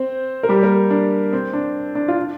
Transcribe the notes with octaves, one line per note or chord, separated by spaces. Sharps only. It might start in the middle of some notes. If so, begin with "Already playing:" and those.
Already playing: C4 C5
A#4
G3 G4
A#3 A#4
D4
C4
D4
D4
F4
D4